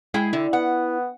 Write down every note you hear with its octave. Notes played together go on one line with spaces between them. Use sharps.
G#3 E4 G#4 G5
D3 E4
B3 F#5